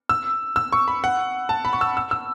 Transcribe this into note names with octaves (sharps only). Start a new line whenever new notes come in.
E6
E6
C#6
B5
F#5
A5
B5
C#6
E6
E6
E6